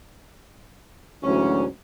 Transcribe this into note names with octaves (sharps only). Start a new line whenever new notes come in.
D2 G#2 E3 F#3 C#4